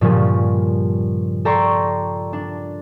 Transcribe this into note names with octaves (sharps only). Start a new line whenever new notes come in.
G2 A#2 C#3 F3 G3 C#4
A4 D5 G5 A#5 C6 C#6
D4